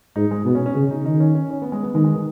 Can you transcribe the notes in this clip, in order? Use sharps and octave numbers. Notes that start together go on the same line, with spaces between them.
G#2 D#4
G#3
B2 B3
C#4
C#4
C#3
D#4
D#3 D#4
C#4
C#4
C#4
B3
G#3
B3
D#3 G#3
G#3
D#3